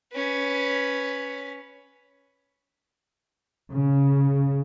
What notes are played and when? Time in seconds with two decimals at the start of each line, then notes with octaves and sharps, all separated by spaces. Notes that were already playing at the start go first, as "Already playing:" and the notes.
0.13 C#4 B4
3.71 C#3